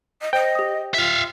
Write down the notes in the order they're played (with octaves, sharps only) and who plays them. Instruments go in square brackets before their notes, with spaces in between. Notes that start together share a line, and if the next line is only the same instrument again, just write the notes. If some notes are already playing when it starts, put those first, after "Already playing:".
[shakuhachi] D#5
[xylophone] C5 [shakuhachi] D#5 [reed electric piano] G5
[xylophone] G4 D#6
[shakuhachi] F4 [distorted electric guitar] E5 F5